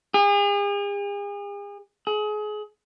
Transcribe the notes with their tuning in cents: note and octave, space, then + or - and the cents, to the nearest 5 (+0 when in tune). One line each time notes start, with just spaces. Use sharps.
G#4 -40
G#4 +30